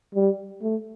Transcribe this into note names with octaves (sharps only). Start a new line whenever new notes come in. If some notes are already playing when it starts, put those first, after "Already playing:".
G3
A3